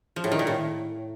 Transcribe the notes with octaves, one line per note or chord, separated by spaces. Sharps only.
F3
A2
D#3
A#2
A2